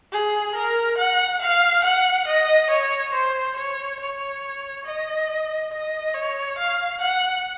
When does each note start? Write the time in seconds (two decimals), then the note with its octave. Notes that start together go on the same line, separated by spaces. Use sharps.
0.12 G#4
0.55 A#4
0.97 F#5
1.41 F5
1.84 F#5
2.27 D#5
2.70 C#5
3.13 C5
3.56 C#5
4.00 C#5
4.85 D#5
5.72 D#5
6.14 C#5
6.58 F5
7.01 F#5